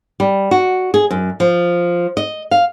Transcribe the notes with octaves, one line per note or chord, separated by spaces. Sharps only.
G3
F#4
G#4
F#2
F3
D#5
F5